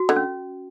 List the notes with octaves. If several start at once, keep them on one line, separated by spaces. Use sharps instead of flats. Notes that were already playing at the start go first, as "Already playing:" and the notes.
Already playing: F#4
D3
C#4